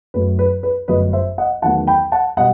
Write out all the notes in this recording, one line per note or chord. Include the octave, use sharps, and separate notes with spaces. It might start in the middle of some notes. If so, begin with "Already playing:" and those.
F#2 F#3 A3 B4
B4
B4
G1 F#2 F#3 A3 B4 D#5
C5 E5
D#5 F#5
E2 D#3 F#3 A3 F#5 A5
G5 B5
F#5 A5
B2 G3 D#5 F#5